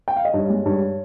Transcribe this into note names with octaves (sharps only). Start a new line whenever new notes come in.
G5
F5
D#5
G2 C#5
G#3
G2 C#5